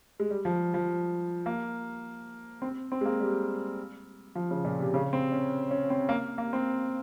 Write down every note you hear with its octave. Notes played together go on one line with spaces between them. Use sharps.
G#3
G3
F3
F3
A#3
C4
C4
G#3
A#3
G3
F3
C#3
A#2
C3
C#3
C4
C#4
C#4
C4
A#3
A#3
C4